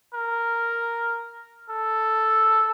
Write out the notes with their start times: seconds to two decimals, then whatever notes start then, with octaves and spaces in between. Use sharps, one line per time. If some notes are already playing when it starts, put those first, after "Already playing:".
0.14 A#4
1.70 A4